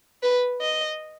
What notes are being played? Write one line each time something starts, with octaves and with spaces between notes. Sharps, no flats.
B4
D#5